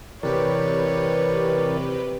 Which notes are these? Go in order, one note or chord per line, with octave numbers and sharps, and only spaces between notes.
C3 E3 G4 A#4 B4 C#5 D5